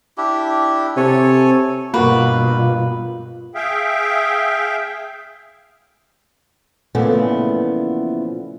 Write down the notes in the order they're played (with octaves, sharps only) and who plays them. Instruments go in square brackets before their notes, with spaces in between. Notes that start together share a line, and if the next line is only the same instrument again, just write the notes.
[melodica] D4 E4 G4
[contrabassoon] C3 [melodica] A4 C#5 G#5
[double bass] G2 B2 [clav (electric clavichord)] A#3 F#4 [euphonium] F4 [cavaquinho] B4
[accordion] G#4 E5 F5 G5
[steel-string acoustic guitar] A#2 C#3 E3 F3 A3 B3